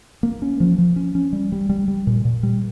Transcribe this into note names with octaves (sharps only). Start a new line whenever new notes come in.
A#3
C#4
F3
F3
C#4
C#4
G3
G3
G3
G3
A#2
A#2
G3